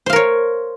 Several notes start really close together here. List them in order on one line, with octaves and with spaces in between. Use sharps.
C5 F5 A#4 C#5